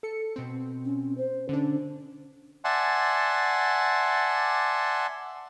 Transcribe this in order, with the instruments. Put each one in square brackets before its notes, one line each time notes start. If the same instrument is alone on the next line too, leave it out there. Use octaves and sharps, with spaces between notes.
[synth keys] A4 C#7
B2 C4
[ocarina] C#4
C5
[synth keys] D3 D4 [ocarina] C#4
[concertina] D5 E5 F#5 G#5 A5 C6